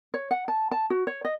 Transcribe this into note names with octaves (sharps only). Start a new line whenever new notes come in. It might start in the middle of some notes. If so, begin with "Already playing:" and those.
C#5
F#5
A5
A5
F#4
C#5
D#5